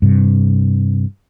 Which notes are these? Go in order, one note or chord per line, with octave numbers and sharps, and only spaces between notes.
G2 C3